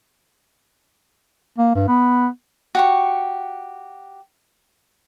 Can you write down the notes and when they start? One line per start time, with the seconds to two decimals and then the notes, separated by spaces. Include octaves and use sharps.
1.58 A#3
1.75 G2
1.88 B3
2.75 F#4 G4 C#6